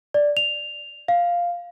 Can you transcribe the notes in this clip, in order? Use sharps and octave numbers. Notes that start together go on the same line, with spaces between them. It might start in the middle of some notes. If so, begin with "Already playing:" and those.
D5
F7
F5